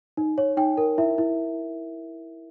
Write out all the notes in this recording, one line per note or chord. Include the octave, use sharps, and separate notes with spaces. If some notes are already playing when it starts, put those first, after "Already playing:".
D#4
C#5
D#4 G5
A#4
E4 E5
E4